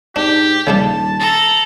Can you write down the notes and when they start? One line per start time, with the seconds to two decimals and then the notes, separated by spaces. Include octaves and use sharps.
0.16 G#2 D4 G4
0.67 D#1 C#3 G3 D4 A5
1.19 A4 A#5